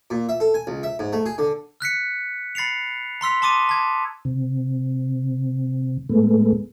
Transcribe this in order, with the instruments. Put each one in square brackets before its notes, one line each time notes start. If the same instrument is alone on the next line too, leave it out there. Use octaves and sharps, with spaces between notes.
[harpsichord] A#2
E5
A4
G#5
C#2
E5
G#2
A3
G#4
D3
[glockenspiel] F6 F#6 B6 C#7
B5 A6 C7 C#7 F7
A#5 C6 E6 B6
A5 C6 D6 D#6 A6 D#7
A5 G#6
[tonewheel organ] C3
A2 G#3 A3 B3